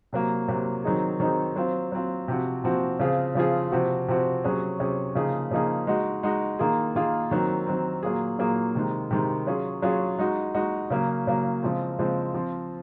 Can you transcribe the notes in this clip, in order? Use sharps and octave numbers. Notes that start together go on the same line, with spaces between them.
C3 F#3 A#3
C3 F#3 A#3
D#3 F#3 C4 D#4 G#4
D#3 F#3 C4 D#4 G#4
F#3 C4 F4
F#3 C4 F4
C3 F3 C4 F#4
C3 F3 C4 F#4
C#3 F3 C4 F4 G#4
C#3 F3 C4 F4 G#4
C3 F3 C4 F#4
C3 F3 C4 F#4
C3 F#3 C#4 G#4
C3 F#3 C#4 G#4
C#3 F3 A#3 D#4 G#4
C#3 F3 A#3 D#4 G#4
G#3 D#4 F#4
G#3 D#4 F#4
D#3 A#3 F4 G#4
D#3 A#3 F4 G#4
D#3 F#3 C4
D#3 F#3 C4
A#2 F#3 A#3 F4 G#4
A#2 F#3 A#3 F4 G#4
C3 D#3 G#3
C3 D#3 G#3
F#3 C#4 F4 G#4
F#3 C#4 F4 G#4
G#3 D#4 F#4
G#3 D#4 F#4
C#3 F#3 A#3
C#3 F#3 A#3
C#3 F3 G#3 C4
C#3 F3 G#3 C4
F3 C4 F4